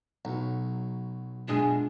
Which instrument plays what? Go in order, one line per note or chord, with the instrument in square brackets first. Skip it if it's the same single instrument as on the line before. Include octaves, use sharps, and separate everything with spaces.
[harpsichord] B1 [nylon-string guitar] F#3 F#4
[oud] F#2 B2 G#4 [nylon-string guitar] G#3 F4 F#4 [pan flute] D4